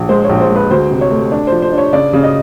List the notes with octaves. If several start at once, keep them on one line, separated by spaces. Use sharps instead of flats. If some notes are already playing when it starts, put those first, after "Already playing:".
Already playing: A#1
G#3 C5
C#5
A#1
C5
G#3
B4
D2 C5
C3
C#5
A3
D4
F3 C5
C5
D4
C#5
C#3 D5
C#3
D#5